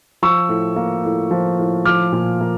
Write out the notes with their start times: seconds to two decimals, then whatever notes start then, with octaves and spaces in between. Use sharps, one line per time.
0.22 F3 C#6 E6
0.49 A2
0.76 A#3
1.05 A2
1.31 F3
1.59 A2
1.85 F3 D6 F6
2.12 A#2
2.41 A#3